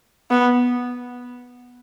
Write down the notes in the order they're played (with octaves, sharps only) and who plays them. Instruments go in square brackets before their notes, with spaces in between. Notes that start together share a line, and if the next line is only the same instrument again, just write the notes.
[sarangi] B3